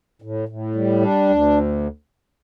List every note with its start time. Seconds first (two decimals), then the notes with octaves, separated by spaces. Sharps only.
0.22 A2
0.49 A2
0.75 G3
1.02 D4
1.29 D2